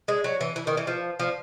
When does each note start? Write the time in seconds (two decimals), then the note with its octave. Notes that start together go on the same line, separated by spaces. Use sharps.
0.08 G#3
0.24 F#3
0.41 E3
0.56 E3
0.67 D#3
0.77 E3
0.87 F3
1.20 F3